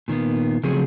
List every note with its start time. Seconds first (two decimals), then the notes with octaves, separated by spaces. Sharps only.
0.08 A#2 D#3 A#3 B3
0.63 C#3 F3 F#3 A3 C4 G#4